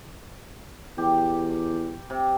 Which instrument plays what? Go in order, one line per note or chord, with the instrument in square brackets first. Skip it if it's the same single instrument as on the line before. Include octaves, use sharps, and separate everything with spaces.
[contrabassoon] E2 [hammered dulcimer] G4
[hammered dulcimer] C3